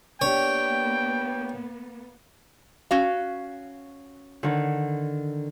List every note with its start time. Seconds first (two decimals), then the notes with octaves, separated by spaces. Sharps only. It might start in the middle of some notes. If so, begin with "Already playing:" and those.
0.21 A#3 B3 D4 G4 C#5 G5
2.91 C#4 F#4 F5
4.43 D3 D#3